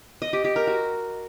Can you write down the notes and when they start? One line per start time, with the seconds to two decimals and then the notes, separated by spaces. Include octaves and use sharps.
0.22 D#5
0.33 G4
0.44 G4
0.56 A#4
0.67 F#4